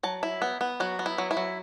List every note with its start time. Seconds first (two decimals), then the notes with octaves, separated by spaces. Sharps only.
0.03 F#3 A5
0.23 E4
0.42 B3
0.61 B3
0.80 F#3 F#4
0.99 B3
1.06 E4
1.18 F#3
1.31 E4
1.37 F#3